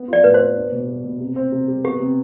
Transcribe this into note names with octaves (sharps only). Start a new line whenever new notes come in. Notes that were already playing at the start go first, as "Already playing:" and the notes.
Already playing: B3
F4 D5
A2 B4
C5
B3
D4
B2
G3
B2
C3
C4
C3
G3
B3 G4
C3